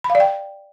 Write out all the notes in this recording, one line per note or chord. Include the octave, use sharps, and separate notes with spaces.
B5
F5
D5
G5